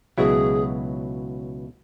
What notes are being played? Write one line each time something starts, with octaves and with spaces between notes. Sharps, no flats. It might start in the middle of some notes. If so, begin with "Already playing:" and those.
C#2 B2 F#3 E4 G#4